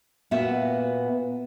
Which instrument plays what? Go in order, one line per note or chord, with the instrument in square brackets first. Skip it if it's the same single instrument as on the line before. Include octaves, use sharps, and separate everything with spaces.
[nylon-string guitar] A#2 B3 F#4 B4 E5